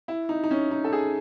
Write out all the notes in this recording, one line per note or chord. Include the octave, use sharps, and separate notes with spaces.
E4
D#4
D#4
C#4
D#4
A4
G#4